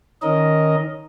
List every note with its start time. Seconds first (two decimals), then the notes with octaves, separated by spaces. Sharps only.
0.22 D#3 C#4 A#4 D#5